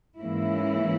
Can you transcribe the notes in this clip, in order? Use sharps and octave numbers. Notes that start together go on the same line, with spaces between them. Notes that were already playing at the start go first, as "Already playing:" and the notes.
G#2 E3 A#3 C#4 E4